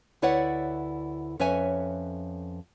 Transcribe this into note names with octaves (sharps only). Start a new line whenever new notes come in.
D2 E4 B4 C#5 D5 F#5
F2 C#4 B4 C#5 E5 G#5